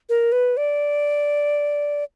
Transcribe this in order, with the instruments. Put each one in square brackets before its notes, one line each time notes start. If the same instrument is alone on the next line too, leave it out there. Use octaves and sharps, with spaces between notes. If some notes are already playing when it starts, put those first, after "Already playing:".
[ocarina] A#4
B4
D5